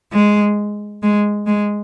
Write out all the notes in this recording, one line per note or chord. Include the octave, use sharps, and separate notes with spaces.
G#3
G#3
G#3